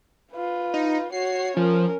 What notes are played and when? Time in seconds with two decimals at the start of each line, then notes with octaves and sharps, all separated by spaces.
0.32 F4 B4
0.74 D#4
1.12 F#4 C#5 C7
1.57 F3 C#4 A#4